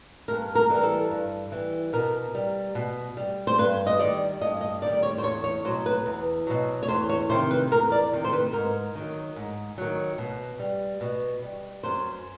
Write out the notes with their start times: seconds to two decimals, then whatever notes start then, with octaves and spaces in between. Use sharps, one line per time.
0.28 G2 A#4
0.55 A#4
0.70 E3 G3 A#4
0.83 A4
1.10 G2
1.52 E3 G3
1.93 B2 A#4
2.35 G3
2.75 B2
3.17 G3
3.47 C5
3.58 G2 B4
3.87 D#5
3.99 D#3 G3 D5
4.41 G2 D#5
4.61 D#5
4.82 D#3 G3 D5
4.93 D5
5.03 C#5
5.18 C5
5.23 E2 C#5
5.44 C#5
5.65 B2 F#3 C5
5.86 B4
6.06 E2
6.47 B2 F#3
6.83 C#5
6.88 E2 C5
7.09 C#5
7.30 C3 D#3 C5
7.51 B4
7.71 E2 A#4
7.92 D5
8.12 C3 D#3
8.25 C5
8.33 B4
8.53 G#2 A#4
8.95 D#3 F#3
9.36 G#2
9.78 D#3 F#3
10.18 B2
10.60 G3
11.01 B2
11.42 G3
11.83 F#2 C5